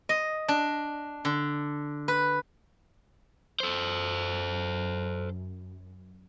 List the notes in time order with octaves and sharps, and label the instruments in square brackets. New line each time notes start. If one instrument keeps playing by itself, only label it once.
[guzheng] D#5
D4
D3
B4
[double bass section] F#2 [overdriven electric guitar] A4 C5